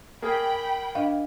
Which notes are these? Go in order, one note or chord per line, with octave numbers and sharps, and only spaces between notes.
A#3 G#4 G5 B5
D4 D#5 F5